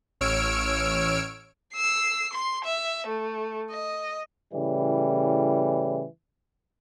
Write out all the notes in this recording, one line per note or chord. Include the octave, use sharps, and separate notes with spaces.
A1 C#5 E6 F6 D7
E6 C7
C6
E5
A3
D#5
A2 C#3 E3 G3